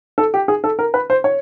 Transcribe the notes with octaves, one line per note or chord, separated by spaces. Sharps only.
A4
G4
G#4
A4
A#4
B4
C5
C#5